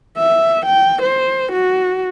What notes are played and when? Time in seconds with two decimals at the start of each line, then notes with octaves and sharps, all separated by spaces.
0.17 E5
0.66 G5
1.02 C5
1.52 F#4